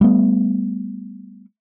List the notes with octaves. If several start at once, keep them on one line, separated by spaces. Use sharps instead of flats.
G3 A3 B3